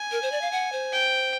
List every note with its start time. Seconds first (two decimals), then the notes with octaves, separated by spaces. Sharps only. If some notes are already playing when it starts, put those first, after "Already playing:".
Already playing: G#5
0.12 A#4
0.22 C5
0.32 D5
0.41 F5
0.52 F#5
0.72 C5
0.92 G5